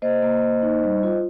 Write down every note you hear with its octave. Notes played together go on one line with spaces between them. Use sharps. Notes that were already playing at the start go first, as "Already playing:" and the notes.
A#3 C5 D#5
A#3
A#3
D#4
G3
F4